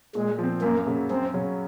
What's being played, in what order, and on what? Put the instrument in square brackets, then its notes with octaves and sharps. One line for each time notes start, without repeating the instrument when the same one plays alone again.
[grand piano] A#2 [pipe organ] G#3
[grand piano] F3 C4
[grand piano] F#2 [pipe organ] A#3
[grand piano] C#3 F#3 A#3
[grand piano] F#2 [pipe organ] C4
[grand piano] C#3 F#3 C#4